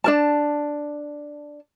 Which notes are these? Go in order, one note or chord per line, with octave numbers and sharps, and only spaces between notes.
D4 A#4 A5